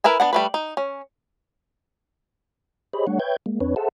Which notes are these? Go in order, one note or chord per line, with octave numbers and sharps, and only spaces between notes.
E4 A#4 B4 E5 G#5
B3 D4 F#5
G3 A3 B4
D#4
C#4
G4 G#4 C5 C#5 D#5 B5
G3 A3 D4 C#5 F#5
B4 C#5 E5 G5 G6 G#6
G#3 A#3
F2 C4 D4 B4 C#5
G#4 A4 C5 E5 F#5 A5